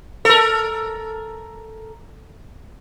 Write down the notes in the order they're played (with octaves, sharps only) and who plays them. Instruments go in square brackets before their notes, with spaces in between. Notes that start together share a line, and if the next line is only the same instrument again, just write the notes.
[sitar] A4 A#4